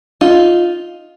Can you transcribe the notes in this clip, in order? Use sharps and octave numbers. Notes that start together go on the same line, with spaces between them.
D#4 F4